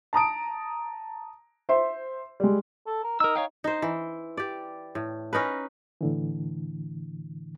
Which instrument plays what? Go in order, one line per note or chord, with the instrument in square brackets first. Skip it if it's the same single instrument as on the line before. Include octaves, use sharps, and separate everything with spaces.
[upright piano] A5 A#5 D#6 D7
C5 E5 C6
G3 G#3
[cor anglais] A4
A#4
[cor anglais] D#4 [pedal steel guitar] A#4 E6
[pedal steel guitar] C#5 F5 G5
[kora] D#4 C5
E3
G4 D5
A2
C#4 D#4 A#4 B4
[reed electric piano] A2 D3 E3